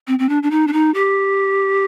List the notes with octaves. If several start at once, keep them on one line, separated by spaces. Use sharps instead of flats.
C4
C4
D4
D4
D#4
D4
D#4
G4